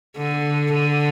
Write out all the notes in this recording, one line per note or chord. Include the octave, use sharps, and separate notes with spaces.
D3
D3